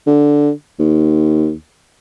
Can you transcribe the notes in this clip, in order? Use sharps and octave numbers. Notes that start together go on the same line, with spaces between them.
D3
D#2